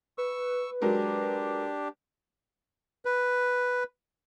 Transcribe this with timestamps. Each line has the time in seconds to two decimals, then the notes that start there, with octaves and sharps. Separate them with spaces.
0.18 B4 C#6 E6
0.82 F#3 G#3 D4 G4 A#4
3.05 B4